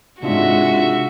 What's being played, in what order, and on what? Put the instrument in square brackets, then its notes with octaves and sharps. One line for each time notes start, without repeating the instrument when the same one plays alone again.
[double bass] G#2 G#3 [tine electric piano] C3 D4 F4 [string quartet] F#4 E5